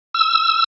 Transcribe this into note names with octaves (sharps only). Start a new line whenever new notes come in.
E6